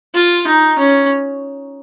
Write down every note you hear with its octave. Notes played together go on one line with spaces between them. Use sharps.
F4
D#4
C#4